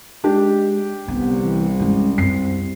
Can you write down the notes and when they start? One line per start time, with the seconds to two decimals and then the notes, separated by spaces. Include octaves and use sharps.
0.24 G#3 D4 G4
1.08 C2 D3 B3
1.42 E3
1.79 G2 G#3 C#4
2.18 F#2 C4 C7